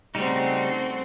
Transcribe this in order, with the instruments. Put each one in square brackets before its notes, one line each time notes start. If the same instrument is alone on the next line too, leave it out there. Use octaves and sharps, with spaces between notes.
[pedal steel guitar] C#3 G3 D#4 [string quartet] A3 C4 F#4